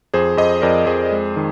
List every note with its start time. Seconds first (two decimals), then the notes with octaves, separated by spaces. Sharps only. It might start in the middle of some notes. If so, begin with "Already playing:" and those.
0.14 F2 G#4 C5
0.37 F2 C5 D#5
0.62 F2 A#4 D5
0.86 F2 G#4 C5
1.11 G#3
1.36 D#3